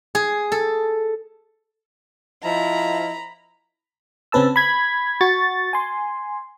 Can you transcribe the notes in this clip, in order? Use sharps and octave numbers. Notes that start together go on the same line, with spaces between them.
G#4
A4
F3 E4 D#5 A#5 B5
C#3 C4 C#4 B4 A5 E6
B5 G#6 B6
F#4 C#6 A6
G#5 C6